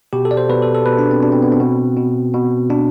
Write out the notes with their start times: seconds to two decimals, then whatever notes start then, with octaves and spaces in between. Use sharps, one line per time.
0.13 B2 G4
0.25 A4
0.31 D5
0.37 C5
0.49 B2 B4
0.62 A4
0.75 A4
0.86 B2 B4
0.98 D4
1.11 C4
1.22 B2 D4
1.32 C4
1.43 B3
1.52 C4
1.60 B2
1.97 B2
2.34 B2
2.70 B2 D4